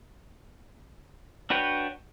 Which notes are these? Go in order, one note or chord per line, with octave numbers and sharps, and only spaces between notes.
D4 F#4 B4 C#5 G5